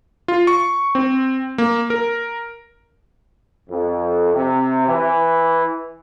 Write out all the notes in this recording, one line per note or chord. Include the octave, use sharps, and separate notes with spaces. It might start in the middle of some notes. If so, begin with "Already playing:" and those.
F4
C#6
C4
A#3
A#4
F2
C3
E3